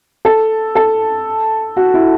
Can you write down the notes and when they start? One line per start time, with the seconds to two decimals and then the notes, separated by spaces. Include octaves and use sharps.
0.25 A4
0.75 A4
1.77 F#4
1.94 E4